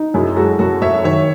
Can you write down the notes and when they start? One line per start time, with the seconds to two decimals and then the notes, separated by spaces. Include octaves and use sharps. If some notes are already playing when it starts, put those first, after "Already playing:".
Already playing: D#4
0.14 F#2 E4 G#4
0.36 G#3 F#4 A4
0.59 F#2 F#4 A4
0.82 F#2 C#5 E5
1.04 D#3 C#5 E5